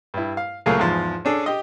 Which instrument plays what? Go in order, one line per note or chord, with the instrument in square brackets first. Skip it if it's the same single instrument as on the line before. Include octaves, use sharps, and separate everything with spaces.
[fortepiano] G2 E4
F5
C#2 F#3 A3 A#3 G#4 F5
E2 G#2 F3
C#4 D4 G#4 A4
G4 D#5